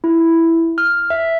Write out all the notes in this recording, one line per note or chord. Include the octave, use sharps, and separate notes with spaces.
E4
F6
E5